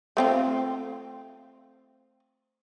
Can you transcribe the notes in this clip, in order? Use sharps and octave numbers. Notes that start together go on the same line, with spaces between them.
A3 C4 F4